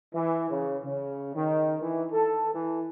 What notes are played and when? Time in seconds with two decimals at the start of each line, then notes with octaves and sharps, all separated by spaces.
0.14 E3
0.51 C#3
0.84 C#3
1.35 D#3
1.82 E3
2.12 A4
2.54 E3